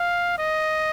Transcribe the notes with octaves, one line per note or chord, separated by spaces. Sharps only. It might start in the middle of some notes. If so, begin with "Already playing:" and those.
Already playing: F5
D#5